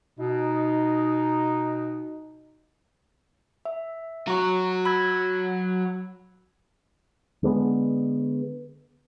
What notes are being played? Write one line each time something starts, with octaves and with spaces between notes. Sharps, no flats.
B2 D#4
E5
F#3 F#4 A#5 C#6
B5 E6 G#6
D3 G#3 A#3 B3